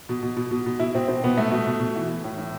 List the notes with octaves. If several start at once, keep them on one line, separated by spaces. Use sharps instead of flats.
B2
B2
B2
B2
B2
B2 E4
B2 C4
B2 C4
B2 B3
B2 A3
B2
B2
B2
E3
E3
A2
A2